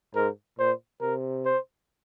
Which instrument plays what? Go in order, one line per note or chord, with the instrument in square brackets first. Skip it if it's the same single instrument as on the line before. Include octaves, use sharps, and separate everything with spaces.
[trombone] G#2 [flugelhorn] A#4
[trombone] A#2 [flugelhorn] C5
[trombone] C3 [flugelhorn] A#4
[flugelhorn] C5